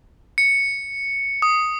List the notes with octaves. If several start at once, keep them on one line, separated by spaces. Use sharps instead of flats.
C#7
D#6